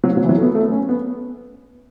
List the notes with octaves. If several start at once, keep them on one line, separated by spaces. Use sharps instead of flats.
F#3
F#3
E3
F#3
A3
B3
A3
C#4
B3